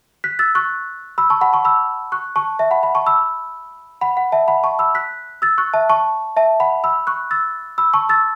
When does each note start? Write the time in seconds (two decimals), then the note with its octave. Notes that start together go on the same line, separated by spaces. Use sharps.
0.24 F#6 B6
0.39 E6 A6
0.55 C#6 F#6
1.18 B5 E6
1.30 A5 C#6
1.41 F#5 B5
1.53 A5 C#6
1.65 B5 E6
2.12 C#6 F#6
2.36 A5 C#6
2.59 E5 A5
2.71 F#5 B5
2.83 F#5 B5
2.95 A5 C#6
3.07 B5 E6
4.01 F#5 B5
4.17 F#5
4.32 E5 A5
4.48 F#5 B5
4.64 A5 C#6
4.79 B5 E6
4.95 F#6 B6
5.42 E6 A6
5.58 C#6 F#6
5.74 E5 A5
5.89 A5 C#6
6.36 E5 A5
6.60 F#5 B5
6.84 B5 E6
7.07 C#6 F#6
7.31 E6 A6
7.78 B5 E6
7.94 A5 C#6
8.09 E6 A6